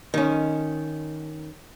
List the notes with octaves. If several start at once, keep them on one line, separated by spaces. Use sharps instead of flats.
D#3 C#4